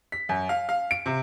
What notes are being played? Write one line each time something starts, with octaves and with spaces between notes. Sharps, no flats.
B6
F#2
F5
F5
D7
C3